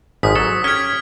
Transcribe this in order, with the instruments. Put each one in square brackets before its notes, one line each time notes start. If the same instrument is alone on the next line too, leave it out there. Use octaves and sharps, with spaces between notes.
[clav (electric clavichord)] G#1 G#2 F3 [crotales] D#6 B6
[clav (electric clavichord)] F#3 A4
[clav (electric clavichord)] C#4 G4 [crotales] F6 G#6